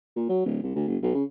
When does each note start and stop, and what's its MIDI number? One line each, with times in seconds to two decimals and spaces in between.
0.16 0.28 46
0.29 0.41 54
0.46 0.61 26
0.63 0.75 36
0.76 0.86 38
0.88 0.97 30
1.03 1.14 35
1.15 1.23 49